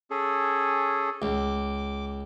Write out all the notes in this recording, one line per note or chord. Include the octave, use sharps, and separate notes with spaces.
C#4 G#4 A4
C#2 D6